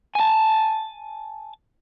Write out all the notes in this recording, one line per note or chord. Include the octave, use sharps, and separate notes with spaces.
G#5 A5